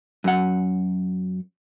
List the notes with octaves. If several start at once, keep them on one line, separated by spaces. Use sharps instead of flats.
F#2 F#5